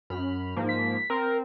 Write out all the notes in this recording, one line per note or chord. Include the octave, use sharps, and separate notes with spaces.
F#2 B5 F6
G#2 F3 A#3
B6
C4 A#4